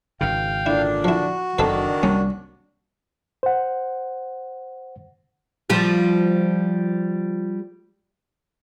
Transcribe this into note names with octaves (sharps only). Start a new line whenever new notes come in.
G#1 C#3 F5 G5
A#2 D3 D4 E4
F3 E4 F#4
F#1 D#3 C4 D4 A4 B4
C2 G3 A#3 C#4
C5 F#5
F3 G3 G4